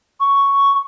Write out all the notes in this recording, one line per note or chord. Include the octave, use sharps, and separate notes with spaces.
C#6